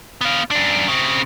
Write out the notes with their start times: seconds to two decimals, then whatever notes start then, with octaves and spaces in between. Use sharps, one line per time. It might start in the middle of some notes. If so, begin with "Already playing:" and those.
0.21 B3 F5
0.51 F#2 D4
0.88 C#3 C4